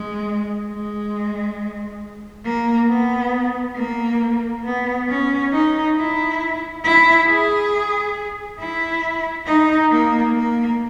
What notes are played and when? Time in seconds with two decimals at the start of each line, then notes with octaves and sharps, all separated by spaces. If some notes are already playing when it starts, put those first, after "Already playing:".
Already playing: G#3
0.68 G#3
2.45 A#3
2.89 B3
3.76 A#3
4.64 B3
5.09 C#4
5.52 D#4
5.96 E4
6.84 E4
7.28 G#4
8.60 E4
9.47 D#4
9.91 A#3
10.36 A#3